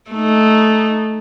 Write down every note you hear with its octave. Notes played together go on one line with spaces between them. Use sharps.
A3 D#4